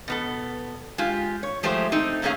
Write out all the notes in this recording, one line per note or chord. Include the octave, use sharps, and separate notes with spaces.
B2 B3 A4
G#3 F4 G4
C#5
F3 G#3 A3 G4 C5
A3 C4 D#4
F#2 A#2 A3 C#4 G#4 F5